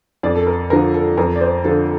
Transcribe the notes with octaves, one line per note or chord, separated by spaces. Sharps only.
F2 D5
A4
A#4
D3 F3 A#4
A4
F2 A#4
D5
C5
D3 F3 A4